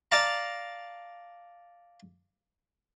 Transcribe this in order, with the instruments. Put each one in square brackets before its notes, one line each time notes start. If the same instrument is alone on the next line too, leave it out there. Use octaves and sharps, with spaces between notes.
[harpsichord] D5 F5 A5 A#5